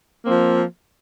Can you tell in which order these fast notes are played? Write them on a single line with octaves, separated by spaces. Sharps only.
A#3 C4 F3